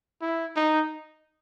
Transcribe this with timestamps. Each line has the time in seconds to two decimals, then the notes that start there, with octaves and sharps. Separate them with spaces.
0.22 E4
0.56 D#4